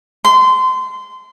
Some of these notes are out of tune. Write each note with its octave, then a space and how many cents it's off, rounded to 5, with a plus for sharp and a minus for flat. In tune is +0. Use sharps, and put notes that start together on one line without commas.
C6 -25